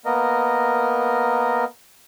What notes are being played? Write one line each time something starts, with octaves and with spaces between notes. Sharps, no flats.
A#3 B3 A#4 D#5